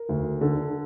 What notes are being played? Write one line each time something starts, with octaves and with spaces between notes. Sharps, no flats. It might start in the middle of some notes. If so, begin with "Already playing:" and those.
Already playing: A#4
D2
D3